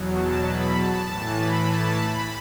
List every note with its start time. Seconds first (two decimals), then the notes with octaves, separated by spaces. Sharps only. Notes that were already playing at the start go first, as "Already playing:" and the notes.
Already playing: E2 B2 F#3
0.13 A5
0.44 B5
0.74 A5
1.05 A2 E3 A5
1.35 B5
1.66 A5
1.97 B5